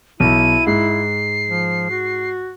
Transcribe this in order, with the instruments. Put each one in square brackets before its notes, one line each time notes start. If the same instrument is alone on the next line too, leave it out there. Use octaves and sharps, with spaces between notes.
[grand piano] B1 [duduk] E4 [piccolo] D#7
[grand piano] G#2 [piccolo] C7
[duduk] F3
F#4